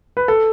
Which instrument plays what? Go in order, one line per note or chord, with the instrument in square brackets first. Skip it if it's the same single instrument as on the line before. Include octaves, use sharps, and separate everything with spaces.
[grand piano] B4
A4